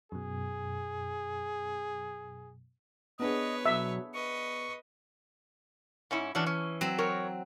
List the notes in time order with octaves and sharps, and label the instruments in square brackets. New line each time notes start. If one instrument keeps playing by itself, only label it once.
[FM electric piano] F#2 B2 [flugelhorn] G#4
[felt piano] B3 D4 G#4 [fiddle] B4 C#5 [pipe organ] D#5
[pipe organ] B2 F#3 [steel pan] E5
[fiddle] B4 D#5 [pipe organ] C#6
[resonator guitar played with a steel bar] G#2 C#4 E4
[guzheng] E3 [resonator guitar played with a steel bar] F#3 C#4 D4
[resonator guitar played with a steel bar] C#4
[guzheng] F#3 C4
[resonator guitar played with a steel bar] A#4 C#5